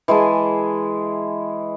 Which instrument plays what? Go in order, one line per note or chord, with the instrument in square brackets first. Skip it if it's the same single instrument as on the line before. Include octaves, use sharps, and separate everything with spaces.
[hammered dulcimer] E3 G#3 G#5 A5